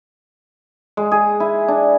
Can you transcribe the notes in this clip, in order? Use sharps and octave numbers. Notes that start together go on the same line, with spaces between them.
G#3
G#4
E4
D4